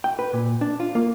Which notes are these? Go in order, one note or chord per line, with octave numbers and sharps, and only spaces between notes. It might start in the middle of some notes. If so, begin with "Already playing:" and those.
G5
B4
A#2
D4
F4
A#3